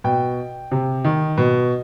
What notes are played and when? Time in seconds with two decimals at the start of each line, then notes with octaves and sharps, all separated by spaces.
0.04 B2 G5
0.71 C3
1.05 D#3
1.38 B2